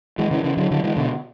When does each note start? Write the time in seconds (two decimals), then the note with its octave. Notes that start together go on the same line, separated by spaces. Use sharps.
0.18 E3 G#3
0.31 C#3 E3
0.44 C#3 E3
0.57 D3 F#3
0.71 D3 F#3
0.83 E3 G#3
0.96 B2 D3